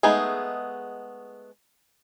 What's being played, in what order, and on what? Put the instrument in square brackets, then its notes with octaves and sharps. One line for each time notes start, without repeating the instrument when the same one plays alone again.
[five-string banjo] G#3 A3 B3 D#4 G#4